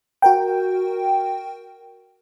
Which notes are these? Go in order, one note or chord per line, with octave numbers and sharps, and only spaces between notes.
F#4 A#4 G5